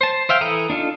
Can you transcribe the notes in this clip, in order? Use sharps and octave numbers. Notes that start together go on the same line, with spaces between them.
C5 A5
C5 E5 F5 G5
E3 E4 A4 A#5 D#6
D4 D#4 F4 A4